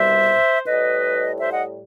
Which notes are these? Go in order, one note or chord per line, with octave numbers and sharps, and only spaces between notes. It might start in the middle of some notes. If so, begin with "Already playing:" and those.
Already playing: C2 B2 G3 C5 E5
A2 G3 B4 D#5
C5 E5
D#5 F#5